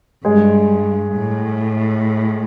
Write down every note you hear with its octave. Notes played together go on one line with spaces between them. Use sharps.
G2 G#3
A2